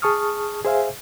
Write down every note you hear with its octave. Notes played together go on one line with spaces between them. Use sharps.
G#4 A5 C#6 D#6 F6
G#4 C5 E5 F5 G#5